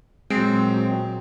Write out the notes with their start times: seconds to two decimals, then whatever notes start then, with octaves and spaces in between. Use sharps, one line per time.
0.30 A#2 F#3 G#3 C4